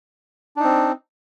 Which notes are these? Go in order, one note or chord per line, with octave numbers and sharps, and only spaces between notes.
C4 D4 D#4